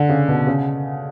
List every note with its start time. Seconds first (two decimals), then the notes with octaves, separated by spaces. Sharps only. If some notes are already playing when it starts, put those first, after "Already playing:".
Already playing: D3
0.09 C#3
0.28 B2
0.47 C#3